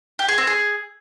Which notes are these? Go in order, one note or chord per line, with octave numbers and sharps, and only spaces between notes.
G4
G#4
C4
G#4